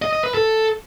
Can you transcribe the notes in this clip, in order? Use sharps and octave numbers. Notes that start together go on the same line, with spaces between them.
D#5
D#5
B4
A4